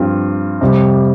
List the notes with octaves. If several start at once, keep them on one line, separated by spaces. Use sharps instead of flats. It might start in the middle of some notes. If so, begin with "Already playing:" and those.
Already playing: G2 F3 C4 F4
F2 C3 G3